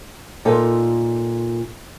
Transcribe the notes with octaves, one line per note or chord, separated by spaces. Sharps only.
A#2 D#4 F4 A4